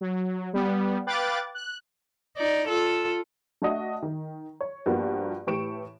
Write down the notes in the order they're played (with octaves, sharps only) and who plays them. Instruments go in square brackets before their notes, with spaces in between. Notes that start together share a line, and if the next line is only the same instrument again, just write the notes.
[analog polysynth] F#3
G3 B3
B4 F5 G5 D6 F#6 A6
F#6
[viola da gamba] D#4 D5
F4 A4
[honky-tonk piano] A3 D4 F#4 D#5 E5
D#3
C#5
G2 F3 G3 A#3 B3 F#4
A2 E3 G4 C#6 D7 E7